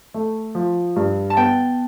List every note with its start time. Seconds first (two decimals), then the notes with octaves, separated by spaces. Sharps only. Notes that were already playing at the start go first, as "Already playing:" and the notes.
0.14 A3
0.55 F3
0.96 G2
1.30 A5
1.37 B3 G5